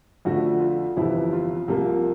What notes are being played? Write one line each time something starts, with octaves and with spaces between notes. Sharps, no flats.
F2 D3 F3 A3 F#4
F4
G1 F2 C3 E3 E4
F4
C2 C3 F3 A#3